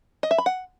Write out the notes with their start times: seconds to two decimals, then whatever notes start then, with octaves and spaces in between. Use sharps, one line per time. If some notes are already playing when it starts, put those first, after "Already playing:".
0.23 D#5
0.31 E5
0.38 B5
0.46 F#5